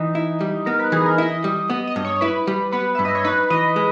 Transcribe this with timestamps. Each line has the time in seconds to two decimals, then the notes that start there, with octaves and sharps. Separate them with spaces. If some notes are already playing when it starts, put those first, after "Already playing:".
Already playing: E3 D#4
0.15 E4
0.41 G3
0.66 B3 A#4
0.79 B4
0.92 E3 G#4
1.06 A#4
1.18 E4 D#5
1.44 G3
1.70 B3 D#5
1.87 D#5
1.96 G2
2.04 C#5
2.21 E4 B4
2.47 G3
2.72 B3 B4
2.95 G2 E5
3.05 D#5
3.15 C#5
3.24 D#4 B4
3.50 E3 D#5
3.76 G#3